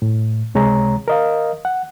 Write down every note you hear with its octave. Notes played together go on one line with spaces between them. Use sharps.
A2
C#2 C3 G#3 C#5 A#5
A#4 D#5 F5
F#5